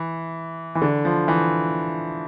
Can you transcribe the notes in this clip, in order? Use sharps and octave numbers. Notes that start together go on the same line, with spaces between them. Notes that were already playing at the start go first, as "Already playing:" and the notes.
Already playing: E3
E3
D3
F3
E3